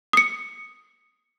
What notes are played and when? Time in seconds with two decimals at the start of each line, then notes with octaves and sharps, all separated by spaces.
0.13 D#6 C#7